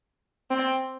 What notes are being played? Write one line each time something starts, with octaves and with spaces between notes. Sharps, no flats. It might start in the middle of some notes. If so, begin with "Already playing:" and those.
C4